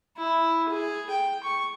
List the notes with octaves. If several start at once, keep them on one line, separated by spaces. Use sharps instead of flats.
E4
G#4
G5
C#6